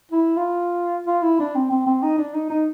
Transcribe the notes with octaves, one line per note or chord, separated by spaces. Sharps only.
E4
F4
F4
E4
D4
C4
C4
C4
D#4
D4
D#4
D#4